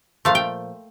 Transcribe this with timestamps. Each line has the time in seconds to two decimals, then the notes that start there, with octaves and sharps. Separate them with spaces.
0.25 A#2 F3 A3 F5
0.35 G5